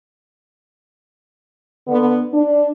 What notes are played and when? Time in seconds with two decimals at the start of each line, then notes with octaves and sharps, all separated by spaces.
1.87 D3 B3
2.33 D4